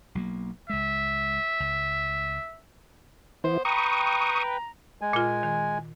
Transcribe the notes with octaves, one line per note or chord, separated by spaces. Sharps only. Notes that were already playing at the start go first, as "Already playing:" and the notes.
B1 F#3 A#3
C#2 G#3 E5
C#2
E3 B3 C5
B4 G5 A#5 C#6 D#6
G#3 G#5
A#2 F4
D#3